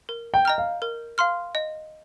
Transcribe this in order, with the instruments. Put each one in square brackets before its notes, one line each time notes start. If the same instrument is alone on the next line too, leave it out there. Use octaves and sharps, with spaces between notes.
[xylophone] A#4
[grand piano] G5
[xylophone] D#5 A#5 F6
[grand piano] F5
[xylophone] A#4
F5 C6 F6
D#5